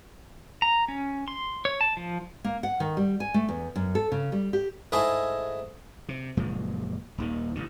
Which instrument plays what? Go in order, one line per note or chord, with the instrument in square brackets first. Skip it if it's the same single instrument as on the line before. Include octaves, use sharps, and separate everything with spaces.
[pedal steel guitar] A#5
C#4
C6
C#5
A5
F3
[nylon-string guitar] A#3
F#5
D#3
G3
G#5
A3
E2
F#2
A4
C#3
G3
G4
[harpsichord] G#2 A3 D#4 E4 G#4 G#5
[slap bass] C3
F#1 A#2 F3 G#3
D#1 D#2 D#3
A1 F2 D3